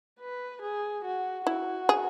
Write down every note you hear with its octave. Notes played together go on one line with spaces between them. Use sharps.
B4
G#4
F#4
E4 F#4
G#4